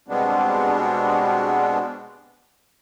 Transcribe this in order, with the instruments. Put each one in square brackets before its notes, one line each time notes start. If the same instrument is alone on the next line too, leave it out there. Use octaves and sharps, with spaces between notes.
[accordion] B2 G3 G#3 B3 C4 D4